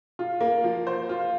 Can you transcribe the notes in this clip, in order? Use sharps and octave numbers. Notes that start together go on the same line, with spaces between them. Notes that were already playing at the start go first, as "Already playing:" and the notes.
F4
A#3
F3
C5
F4